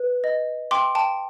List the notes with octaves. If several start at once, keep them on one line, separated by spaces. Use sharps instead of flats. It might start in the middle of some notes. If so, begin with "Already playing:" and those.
Already playing: B4
D#5
G5 C6 D6
G5 A5